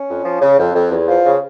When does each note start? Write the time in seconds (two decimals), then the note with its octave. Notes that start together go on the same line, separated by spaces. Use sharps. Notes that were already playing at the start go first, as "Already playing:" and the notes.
Already playing: C#4
0.09 F2
0.25 F3
0.41 C#3
0.59 F2
0.75 F2
0.91 E2
1.08 F3
1.26 C#3